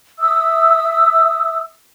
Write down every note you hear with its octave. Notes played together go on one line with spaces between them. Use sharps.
E5 D#6 E6